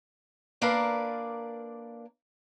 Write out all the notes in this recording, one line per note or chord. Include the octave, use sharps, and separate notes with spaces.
A#3 D4 A#4 B4 D5 F5